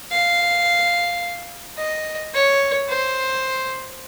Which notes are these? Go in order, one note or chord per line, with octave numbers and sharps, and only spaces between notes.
F5
D#5
C#5
C5